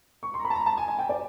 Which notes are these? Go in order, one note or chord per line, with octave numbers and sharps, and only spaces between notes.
C#6
C6
A#5
B5
A5
A#5
A5
G#5
G#5
G5
D5